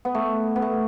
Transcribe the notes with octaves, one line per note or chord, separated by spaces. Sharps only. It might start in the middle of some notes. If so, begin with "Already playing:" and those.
B3
A3
B3
A3